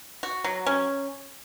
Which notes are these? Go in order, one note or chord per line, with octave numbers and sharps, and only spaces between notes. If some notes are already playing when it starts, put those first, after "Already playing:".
F#4
F#3
C#4